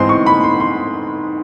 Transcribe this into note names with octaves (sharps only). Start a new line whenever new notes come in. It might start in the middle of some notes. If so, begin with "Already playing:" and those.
Already playing: G#2 E3 G#3 C4 D#4 C6
C#6
B5
C6
C6